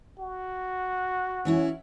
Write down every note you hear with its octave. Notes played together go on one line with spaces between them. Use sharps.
F#4
E3 C#4 E4